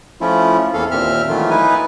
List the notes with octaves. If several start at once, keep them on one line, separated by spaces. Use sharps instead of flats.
F3 A3 C#4 E4 F4
E2 E3 A#3 A4 F5
D#2 A#2 C4 E5 F6
D#3 E3 F#3 A3 F4
D#4 E4 B4 G#5